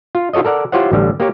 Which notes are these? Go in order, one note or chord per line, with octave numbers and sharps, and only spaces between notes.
F4
F4 F#4 A4 C#5 D#5
A4 A#4 D5 F#5
E4 F4 G4 C5 C#5 F#5
A1 D3 G3
A#3 G4 C#5